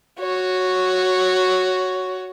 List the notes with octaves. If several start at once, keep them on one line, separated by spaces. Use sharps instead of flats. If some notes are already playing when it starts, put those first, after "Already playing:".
F#4 C#5